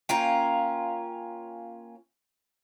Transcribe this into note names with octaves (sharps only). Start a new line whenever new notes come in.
A#3 C#4 F4 G5